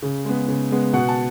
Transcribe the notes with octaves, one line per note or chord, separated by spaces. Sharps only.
C#3
G#3 B3
C#3
G#3 B3
B2 F#5
A5